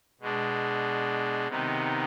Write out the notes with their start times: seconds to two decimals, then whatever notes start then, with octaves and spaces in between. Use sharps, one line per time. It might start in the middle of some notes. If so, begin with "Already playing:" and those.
0.21 B2 G#3 D4
1.47 C3 D#3 B3 D#4